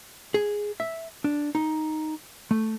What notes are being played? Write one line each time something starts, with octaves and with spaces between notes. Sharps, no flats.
G#4
E5
D4
D#4
A3